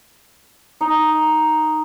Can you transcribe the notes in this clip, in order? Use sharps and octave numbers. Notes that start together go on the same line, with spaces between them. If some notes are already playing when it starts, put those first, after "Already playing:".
D#4